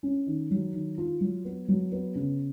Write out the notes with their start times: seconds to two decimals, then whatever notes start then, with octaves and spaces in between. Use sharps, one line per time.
0.03 C#4
0.27 D#3
0.51 F#3
0.74 D#3
0.98 F4
1.21 F#3
1.45 B3
1.68 F#3
1.92 B3
2.15 C#3